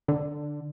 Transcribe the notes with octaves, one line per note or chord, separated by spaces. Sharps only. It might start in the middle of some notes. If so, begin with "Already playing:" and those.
D3